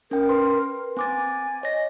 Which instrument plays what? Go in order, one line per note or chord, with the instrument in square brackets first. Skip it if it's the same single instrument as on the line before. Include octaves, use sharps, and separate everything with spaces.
[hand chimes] C#4 G5 [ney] A#4
[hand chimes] B4 C6
[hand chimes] C4 D6 A6 [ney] G#5
[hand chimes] C#5 A#6 [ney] D#5